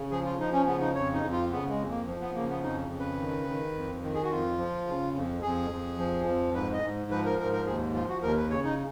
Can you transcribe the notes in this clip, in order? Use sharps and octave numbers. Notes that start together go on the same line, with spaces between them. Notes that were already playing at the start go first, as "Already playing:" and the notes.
Already playing: C#3
F3 G#4
F4
F3 D#4
C#4
C#3 B3
D#4
F2 C#5
D#4
F2
F4
C#3 B3
G#3
F2
A#3
F3
B3
C#3 A#3
B3
F2 D#4
C#3
B4
D#3
D#3
F2
D#3
G#4
F#4
F2 F4
F3
C#3
F2
F2 G#4
F2
F3
F2
G#2 B4
D#5
G#2
F3 B4
A#4
G#2 A#4
A#4
D#2 G#4
F3 F4
F#4
D#2 A#4
B4
C#3 C#5
D#4